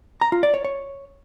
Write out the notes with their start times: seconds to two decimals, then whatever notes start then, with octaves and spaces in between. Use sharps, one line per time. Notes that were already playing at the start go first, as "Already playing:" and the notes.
0.21 A#5
0.32 F4
0.43 D5
0.54 C#5
0.65 C#5